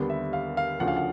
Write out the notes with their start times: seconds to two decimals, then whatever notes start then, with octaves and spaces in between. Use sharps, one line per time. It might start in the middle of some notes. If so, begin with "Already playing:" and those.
Already playing: D#2 D3 G3 B3
0.10 E5
0.33 F5
0.57 F5
0.80 D2 C#3 F3 F#5
0.88 F5
0.97 F#5